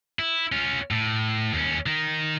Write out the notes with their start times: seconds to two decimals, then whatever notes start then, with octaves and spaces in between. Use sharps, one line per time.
0.19 E4
0.52 C#4 F4
0.91 A2
1.53 D#2 C#4
1.86 D#3 D#4